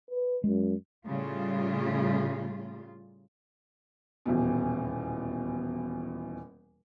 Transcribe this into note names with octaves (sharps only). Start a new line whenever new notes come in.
B4
F#2 G#3
A2 C#3 G3 F4
D#1 E2 B2